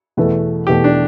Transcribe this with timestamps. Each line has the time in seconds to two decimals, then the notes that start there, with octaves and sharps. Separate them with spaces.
0.17 E2 B2 A3 E4 B4
0.67 E2 B2 A3 E4 G4 B4
0.84 D4